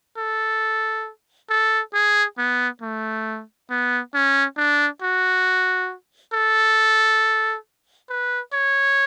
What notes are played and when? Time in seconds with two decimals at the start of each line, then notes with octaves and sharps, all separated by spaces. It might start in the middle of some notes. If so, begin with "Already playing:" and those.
0.18 A4
1.50 A4
1.94 G#4
2.38 B3
2.81 A3
3.70 B3
4.14 C#4
4.57 D4
5.02 F#4
6.33 A4
8.09 B4
8.53 C#5